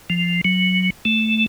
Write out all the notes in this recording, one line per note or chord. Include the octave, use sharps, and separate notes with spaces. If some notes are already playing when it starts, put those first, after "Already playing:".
F3
F#3
A3